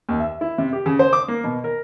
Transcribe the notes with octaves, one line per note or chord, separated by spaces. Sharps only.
D#2
E5
E4
C3
G4
C#3
C5
D6
A#3
B2
A#4